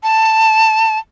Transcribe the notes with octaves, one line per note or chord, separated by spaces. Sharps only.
A5